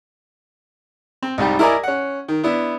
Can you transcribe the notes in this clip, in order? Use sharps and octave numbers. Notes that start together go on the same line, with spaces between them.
C4
C2 G#2 G3 G4
E4 A#4 D5 D#5 G#5
C#4 F#5
D#3
B3 D4 E4 E5